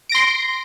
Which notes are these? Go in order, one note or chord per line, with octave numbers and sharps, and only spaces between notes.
C6 A#6 D7